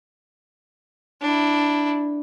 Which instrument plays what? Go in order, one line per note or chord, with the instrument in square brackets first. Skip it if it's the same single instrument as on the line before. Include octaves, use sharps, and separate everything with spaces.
[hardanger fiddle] D4 E4